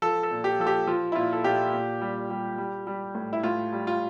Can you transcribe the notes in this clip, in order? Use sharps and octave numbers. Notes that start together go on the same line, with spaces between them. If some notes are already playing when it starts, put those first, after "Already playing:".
F3 A4
A4
A#2
G4
F3 A4
G4
F3 F4
E4
A#2 F4
A4
A#2 G4
A#2
G3
G3
G3
G3
A2
E4
A2 F4
G3
F4